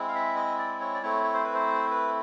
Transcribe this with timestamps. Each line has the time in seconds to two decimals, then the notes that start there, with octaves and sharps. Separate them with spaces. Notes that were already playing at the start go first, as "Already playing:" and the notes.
Already playing: G#3 C4 E4
0.08 F5
0.15 E5
0.36 D#5
0.58 D5
0.81 C#5
0.94 D5
1.02 A3 C4 E4 C#5
1.24 C#5
1.34 C5
1.44 B4
1.54 C5
1.90 B4